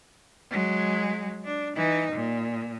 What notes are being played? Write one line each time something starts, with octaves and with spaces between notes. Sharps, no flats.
F#3 G#3
D4
E3 D#4
A#2